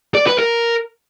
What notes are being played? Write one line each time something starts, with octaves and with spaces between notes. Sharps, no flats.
D5
B4
A#4